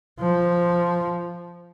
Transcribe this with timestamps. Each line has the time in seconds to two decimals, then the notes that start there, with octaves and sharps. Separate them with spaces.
0.20 F3